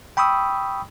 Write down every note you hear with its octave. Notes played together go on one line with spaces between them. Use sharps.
G5 B5 C#6 D#6 E6